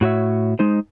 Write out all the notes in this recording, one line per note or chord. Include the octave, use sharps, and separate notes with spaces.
A2 F#4 C#5 E5
G#3 D#4 C5